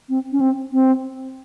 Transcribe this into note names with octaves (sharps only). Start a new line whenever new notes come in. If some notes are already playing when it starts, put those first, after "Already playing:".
C4
C#4
C4
C4